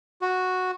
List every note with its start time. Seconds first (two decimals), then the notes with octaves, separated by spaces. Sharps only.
0.22 F#4